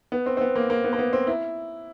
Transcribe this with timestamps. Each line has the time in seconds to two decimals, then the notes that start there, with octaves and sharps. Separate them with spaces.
0.12 B3
0.26 C4
0.37 C4
0.41 B3
0.56 A#3
0.70 A#3
0.84 B3
0.93 A#3
0.99 B3
1.13 C4
1.27 E4